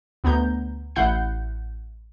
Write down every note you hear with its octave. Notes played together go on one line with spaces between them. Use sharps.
D2 B3 A#5 G6
A1 E4 F#5 G6 C7